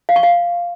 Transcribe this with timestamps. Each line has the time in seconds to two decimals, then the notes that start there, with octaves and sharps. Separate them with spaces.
0.09 F5
0.16 C#6
0.23 F5